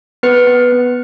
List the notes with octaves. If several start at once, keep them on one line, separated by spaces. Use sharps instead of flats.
B3 B4
B3
B3